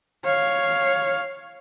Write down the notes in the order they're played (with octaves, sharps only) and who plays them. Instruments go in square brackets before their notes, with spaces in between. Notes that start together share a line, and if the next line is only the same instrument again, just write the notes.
[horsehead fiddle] C#5 F5